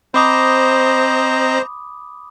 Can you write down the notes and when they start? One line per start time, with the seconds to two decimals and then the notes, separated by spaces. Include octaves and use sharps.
0.14 C4 C5 D#5 A#5 B5 D6 D#6